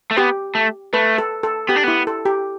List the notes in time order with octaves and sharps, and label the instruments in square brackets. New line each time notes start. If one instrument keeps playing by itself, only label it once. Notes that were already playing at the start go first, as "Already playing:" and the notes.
[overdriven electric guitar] A3
[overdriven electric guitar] B3 [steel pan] G4
[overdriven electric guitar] A3
[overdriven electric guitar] A3 [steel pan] B4
[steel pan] A4
A4
[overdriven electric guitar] B3 [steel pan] G4
[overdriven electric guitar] D4
[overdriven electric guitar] B3 [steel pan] E4
[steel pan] A4
G4